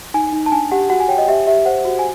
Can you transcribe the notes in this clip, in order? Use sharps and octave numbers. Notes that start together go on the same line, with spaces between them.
D#4 G#5
D#4
A5
D4 G#5
G4 F#5
F#4 F#5
G#5
C#5 G5
D#5
G4 E5
G4 E5
C5 F#5
F#4
G#5